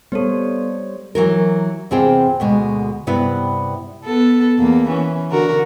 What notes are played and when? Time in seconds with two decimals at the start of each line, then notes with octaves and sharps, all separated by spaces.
0.12 G3 B3 A4 C5 C#5
1.15 E3 F#3 A#4
1.91 E2 C3 C4 F4 G#4 G5
2.40 D2 B2 G#3
3.07 G2 C3 B3 E4 B4 D5
4.05 B3 A4
4.59 E2 A#3
4.88 E3 C#4
5.31 D3 F#4 A#4